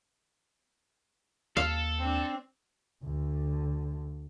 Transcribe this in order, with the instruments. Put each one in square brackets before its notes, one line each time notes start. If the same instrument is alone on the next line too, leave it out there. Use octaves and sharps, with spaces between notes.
[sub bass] D#2 [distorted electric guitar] A4 [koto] F5
[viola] C4 D4
[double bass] D2 D3